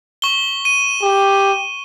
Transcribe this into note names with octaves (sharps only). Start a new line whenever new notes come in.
C#6 G7
D#7
G4